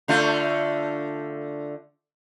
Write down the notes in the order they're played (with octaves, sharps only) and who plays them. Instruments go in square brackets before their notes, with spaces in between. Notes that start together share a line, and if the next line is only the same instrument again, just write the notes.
[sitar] D3 A3 F4